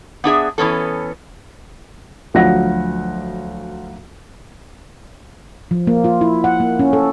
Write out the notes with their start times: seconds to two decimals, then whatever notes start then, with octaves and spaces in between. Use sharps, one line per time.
0.24 B3 D4 G#4 E5
0.58 E3 B3 C#4 A4
2.34 D2 F3 F#3 F#4 F#5 A#6
5.71 F3
5.87 A#3
6.04 F4
6.21 E4
6.44 F#5
6.60 A#3
6.79 C#4
6.93 A4